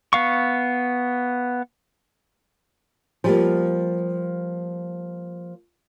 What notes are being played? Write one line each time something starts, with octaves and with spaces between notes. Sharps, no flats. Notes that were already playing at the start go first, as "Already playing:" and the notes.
B3 F5 C#6
F3 G3 A#3